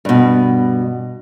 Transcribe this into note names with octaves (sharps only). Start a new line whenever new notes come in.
G2 B2